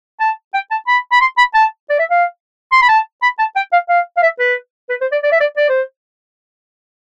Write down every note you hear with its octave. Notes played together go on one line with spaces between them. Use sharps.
A5
G5
A5
B5
B5
C6
B5
A5
D5
E5
F5
C6
B5
A5
B5
A5
G5
F5
F5
F5
E5
B4
B4
C5
D5
D5
E5
D5
D5
C5